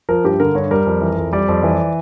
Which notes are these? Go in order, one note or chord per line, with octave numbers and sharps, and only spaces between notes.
F3 A#4
G2 G4
D3 A#4
G2 C#5
G3 A#4
F2
E3
F2
G3 D5
F2
E3